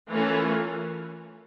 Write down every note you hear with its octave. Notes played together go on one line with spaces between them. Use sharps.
E3 A3 C#4 F4 A#4